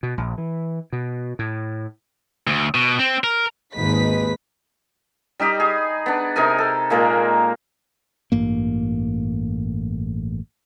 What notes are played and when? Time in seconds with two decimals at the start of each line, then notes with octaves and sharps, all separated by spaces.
0.03 B2
0.18 A#1
0.38 E3
0.93 B2
1.39 A2
2.47 D2
2.75 B2
2.99 C4
3.24 A#4
3.75 G#1 D#2 G#3 D#4 B4 B6
5.40 G3 D#4 G4 D#5
5.60 G#4
6.06 B3 D4
6.36 C3 D#4 A#4 G#5
6.58 A4
6.90 A#2 G#3 A#3 A#4
8.32 A1 G2 A#3